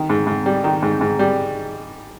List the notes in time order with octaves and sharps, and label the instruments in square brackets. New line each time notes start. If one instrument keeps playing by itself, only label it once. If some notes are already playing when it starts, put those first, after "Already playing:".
Already playing: [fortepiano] D#3
G#2
G#2
G3
D#3
G#2
G#2
G3